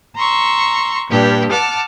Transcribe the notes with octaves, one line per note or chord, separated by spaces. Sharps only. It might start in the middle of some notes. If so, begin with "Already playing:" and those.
A#5 C6 C#6 E6
G2 A#2 D4 G4
F#5 A5 D6 F6